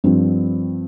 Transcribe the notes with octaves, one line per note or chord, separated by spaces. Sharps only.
G2 F3 C4